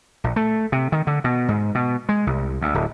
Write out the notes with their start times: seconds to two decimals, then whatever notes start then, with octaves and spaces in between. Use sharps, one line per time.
0.24 A#1
0.36 A3
0.72 C3
0.92 D#3
1.07 D3
1.24 B2
1.48 G#2
1.75 B2
2.09 G#3
2.27 C2
2.61 D2
2.74 D1